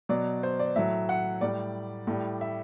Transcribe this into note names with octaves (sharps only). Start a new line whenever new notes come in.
B2 F#3 D5
C5
D5
A2 F#3 E5
F#5
A2 G3 D5
A2 G3
E5